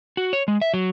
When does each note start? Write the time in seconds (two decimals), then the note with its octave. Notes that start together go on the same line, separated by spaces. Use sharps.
0.17 F#4
0.33 C#5
0.48 G#3
0.62 E5
0.74 F#3